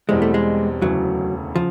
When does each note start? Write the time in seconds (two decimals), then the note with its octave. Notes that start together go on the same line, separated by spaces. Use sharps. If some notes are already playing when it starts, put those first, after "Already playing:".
0.09 E1 E2 B2 G3 G#3 C4
0.22 A3
0.34 G#3
0.82 E1 D2 C#3 E3 F#3 A3
1.56 C#3 F3